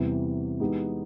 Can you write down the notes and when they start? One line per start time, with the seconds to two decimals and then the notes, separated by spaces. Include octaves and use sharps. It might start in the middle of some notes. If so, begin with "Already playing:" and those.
Already playing: E2 C3 E3 G3
0.60 E3 G#3 B3 D#4 G4